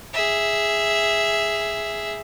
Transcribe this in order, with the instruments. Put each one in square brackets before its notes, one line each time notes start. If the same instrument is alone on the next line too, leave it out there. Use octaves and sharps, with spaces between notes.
[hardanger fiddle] G#4 E5